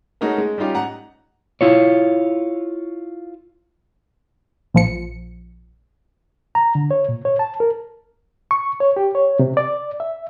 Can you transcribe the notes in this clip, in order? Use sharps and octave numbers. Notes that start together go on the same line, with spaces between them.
G#3 A3 C#4 D#4 F#4 A#4
G#3
G3 C#4 D#4 F4 G4
G#2 F#5 A#5
E4 F4 C#5
A#1 F3 C#7
A#5
D3
C#5
A#2
C#5
A5
A#4
C#6
C#5
G4
C#5
C3
D5
E5